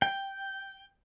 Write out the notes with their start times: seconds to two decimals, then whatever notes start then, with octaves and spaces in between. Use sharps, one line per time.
0.02 G5